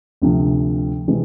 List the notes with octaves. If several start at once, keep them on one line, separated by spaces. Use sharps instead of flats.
D2 C3 F3
C3 E3 G#3